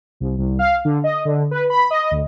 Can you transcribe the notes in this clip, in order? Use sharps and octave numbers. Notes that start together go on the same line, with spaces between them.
C2
C2
F5
D3
D#5
D3
B4
B5
D#5
D2